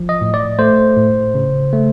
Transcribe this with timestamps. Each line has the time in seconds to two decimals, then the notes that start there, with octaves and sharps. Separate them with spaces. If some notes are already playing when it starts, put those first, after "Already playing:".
Already playing: F3
0.09 D#5
0.21 A2
0.34 D5
0.59 A3 C5
0.97 A2
1.35 C#3
1.73 A3